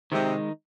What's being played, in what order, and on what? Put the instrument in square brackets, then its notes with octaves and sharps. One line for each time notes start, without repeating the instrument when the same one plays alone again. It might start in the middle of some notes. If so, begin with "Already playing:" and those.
[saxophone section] C3 [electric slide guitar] D#3 G#3 D#4